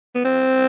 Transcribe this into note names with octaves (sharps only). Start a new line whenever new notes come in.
B3
C4